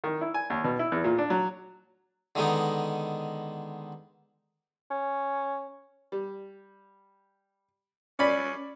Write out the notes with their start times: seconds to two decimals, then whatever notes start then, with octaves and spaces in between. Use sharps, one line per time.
0.04 D#3
0.21 E4
0.34 G#5
0.50 D#2
0.64 B2
0.79 E4
0.92 E2
1.04 A#2
1.18 D4
1.30 F#3
2.35 D3 D#3 G#3 B3 D#4
4.91 C#4
6.12 G3
8.19 C#4 D5 B5